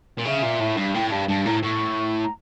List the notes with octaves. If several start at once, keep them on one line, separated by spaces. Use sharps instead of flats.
A#2
C#3 E5
A#2
A2
G2
A2 G5
G2 A5
G2 A5
A2 A#5
A2 C#6
A#5